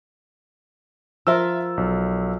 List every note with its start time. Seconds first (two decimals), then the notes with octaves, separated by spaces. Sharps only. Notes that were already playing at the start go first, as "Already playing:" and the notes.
1.27 F3 F4 A#4 E5 E6
1.77 B1